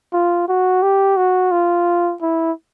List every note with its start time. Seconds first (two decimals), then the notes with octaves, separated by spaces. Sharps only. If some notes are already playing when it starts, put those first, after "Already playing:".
0.13 F4
0.48 F#4
0.83 G4
1.17 F#4
1.52 F4
2.22 E4